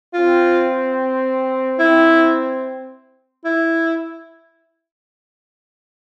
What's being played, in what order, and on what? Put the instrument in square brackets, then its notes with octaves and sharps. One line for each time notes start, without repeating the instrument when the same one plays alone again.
[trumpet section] C4 [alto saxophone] F4
[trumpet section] C4 [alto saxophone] E4
[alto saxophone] E4